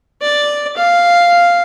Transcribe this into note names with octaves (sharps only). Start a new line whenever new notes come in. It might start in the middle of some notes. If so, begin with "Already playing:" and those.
D5
F5